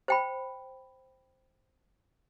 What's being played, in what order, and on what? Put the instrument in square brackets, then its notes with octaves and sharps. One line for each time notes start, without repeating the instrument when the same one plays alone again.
[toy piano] C5 G5 B5